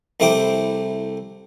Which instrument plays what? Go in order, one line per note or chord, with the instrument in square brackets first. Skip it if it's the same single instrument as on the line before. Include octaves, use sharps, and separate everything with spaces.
[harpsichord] C2 A3 E4 C5 G5 D6